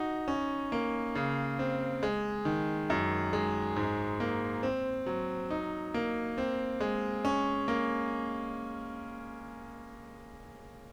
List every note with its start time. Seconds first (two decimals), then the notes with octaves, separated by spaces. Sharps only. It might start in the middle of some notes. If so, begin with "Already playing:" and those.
Already playing: D#4 F#4
0.28 C#4
0.72 A#3
1.15 C#3
1.59 C4
2.03 G#3
2.45 D#3
2.90 F#2
3.33 G#3
3.76 G#2
4.20 A#3
4.63 C4
5.06 F#3
5.50 D#4
5.94 A#3
6.38 C4
6.80 G#3
7.25 C#4
7.68 A#3